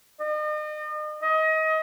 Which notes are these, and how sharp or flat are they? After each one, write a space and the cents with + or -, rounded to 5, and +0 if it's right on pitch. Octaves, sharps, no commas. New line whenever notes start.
D#5 -40
D#5 +25